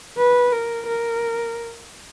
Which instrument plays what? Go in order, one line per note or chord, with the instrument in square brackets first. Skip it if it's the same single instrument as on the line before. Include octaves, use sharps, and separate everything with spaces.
[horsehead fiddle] B4
A#4
A#4